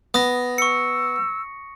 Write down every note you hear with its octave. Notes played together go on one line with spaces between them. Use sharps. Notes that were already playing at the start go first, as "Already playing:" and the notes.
B3 D#6 A#6
C#6 E6 C#7